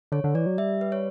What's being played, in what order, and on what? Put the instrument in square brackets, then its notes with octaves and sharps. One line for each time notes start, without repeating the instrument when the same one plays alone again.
[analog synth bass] D3 [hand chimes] C#5
[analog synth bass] D3
[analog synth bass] E3 [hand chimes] D5
[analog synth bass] F#3
[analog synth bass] G3 [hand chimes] E5
[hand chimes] B4
C#5